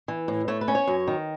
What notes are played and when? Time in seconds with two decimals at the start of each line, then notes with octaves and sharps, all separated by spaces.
0.08 E3
0.28 A2
0.48 A3 C#5
0.61 B4
0.68 C#4
0.75 C#5
0.88 F#2
1.07 D#3